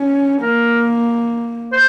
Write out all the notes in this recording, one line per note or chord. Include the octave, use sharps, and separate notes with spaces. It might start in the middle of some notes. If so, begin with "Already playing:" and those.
Already playing: C#4
A#3 A#4
C5